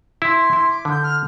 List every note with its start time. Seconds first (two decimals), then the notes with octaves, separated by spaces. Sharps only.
0.22 E4 C6
0.53 E4
0.70 D6
0.85 D3 G6
1.03 F6